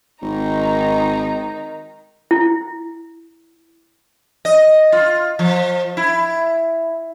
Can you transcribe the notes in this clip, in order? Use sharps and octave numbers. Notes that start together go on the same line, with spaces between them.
G#1 D#3 D#4 A#5
E4
D#5
F4
F3
E4